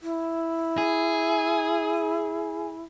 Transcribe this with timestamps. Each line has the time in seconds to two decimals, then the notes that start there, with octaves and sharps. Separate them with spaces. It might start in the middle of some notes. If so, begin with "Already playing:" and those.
0.01 E4
0.78 G#4